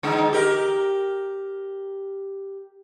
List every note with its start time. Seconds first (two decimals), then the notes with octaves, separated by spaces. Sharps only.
0.03 D3 G#3 D#4
0.33 G4 A#4